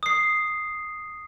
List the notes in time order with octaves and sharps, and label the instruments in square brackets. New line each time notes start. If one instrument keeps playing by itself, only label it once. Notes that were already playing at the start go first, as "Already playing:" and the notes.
[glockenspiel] D#6 C7